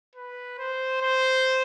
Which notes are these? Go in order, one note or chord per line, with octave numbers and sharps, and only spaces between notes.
B4
C5
C5